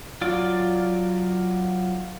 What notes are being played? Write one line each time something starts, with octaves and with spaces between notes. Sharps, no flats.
F#3 F4 D5